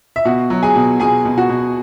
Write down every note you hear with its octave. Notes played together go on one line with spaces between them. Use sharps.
E5
B2 F#4 F#5
F#3
G#4 G#5
B2
B2 G#4 G#5
B2
F#4 F#5
B2